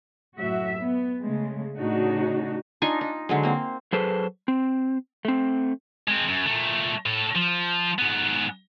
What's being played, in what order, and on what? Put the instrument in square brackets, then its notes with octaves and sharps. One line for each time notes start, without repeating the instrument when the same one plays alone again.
[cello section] F#2 A2 F#4 E5
B3
C#3 G#3 A3
A2 C#3 D4 D#4 F#4
[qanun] D4 D#4 F4 G#5
D#4
D3 F#3 G#3
A#3 C4
[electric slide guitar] F#3 G#4 A4 B4 C5
C4
A3 C4
[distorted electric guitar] G#3 C4
F#2
A#2 A3
A2 A4
F3
G#2 B3